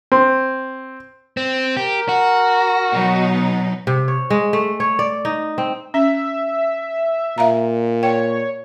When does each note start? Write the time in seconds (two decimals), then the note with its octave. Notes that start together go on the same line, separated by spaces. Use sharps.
0.12 C4
1.37 C4
1.77 G4 A#4
2.09 F#4
2.92 B2 F#3 D#4
3.87 C3
4.08 C#5
4.30 G#3
4.53 A3
4.80 C#5
4.99 D5
5.25 D#4
5.58 C4
5.94 C#4 E5
7.38 A#2 E5 F5 A#5
8.03 C#5 G5